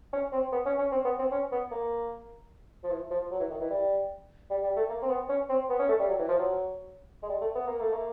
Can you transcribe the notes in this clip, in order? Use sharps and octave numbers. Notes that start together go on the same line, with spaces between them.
C#4
C4
B3
C#4
C#4
C4
B3
C4
C#4
B3
A#3
F3
E3
F3
F#3
E3
D#3
E3
G3
G3
G3
A3
A#3
C4
B3
C#4
C4
B3
C#4
A3
G3
F#3
E3
F3
F#3
G#3
G3
A3
B3
A#3
A3
A#3